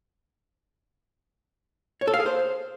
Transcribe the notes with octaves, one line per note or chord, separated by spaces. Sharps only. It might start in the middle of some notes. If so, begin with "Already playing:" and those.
C#5
A4
F5
G#4
C5